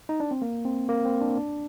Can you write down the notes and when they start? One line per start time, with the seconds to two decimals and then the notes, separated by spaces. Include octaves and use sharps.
0.09 D#4
0.20 D4
0.31 C4
0.42 A#3
0.65 C4
0.89 A#3
1.05 C4
1.21 D4
1.37 D4